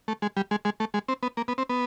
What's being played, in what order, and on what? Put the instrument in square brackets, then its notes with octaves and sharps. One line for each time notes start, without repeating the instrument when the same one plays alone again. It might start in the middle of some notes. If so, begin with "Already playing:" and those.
[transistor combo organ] A3
G#3
G3
G#3
G#3
A3
G#3
C4
B3
A#3
B3
C4
B3